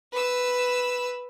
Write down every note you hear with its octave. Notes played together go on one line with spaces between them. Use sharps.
B4 E6